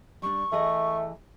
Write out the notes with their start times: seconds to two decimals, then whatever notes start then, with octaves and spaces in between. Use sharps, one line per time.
0.22 G3 D4 C#6
0.52 E3 A3 G#4 D#5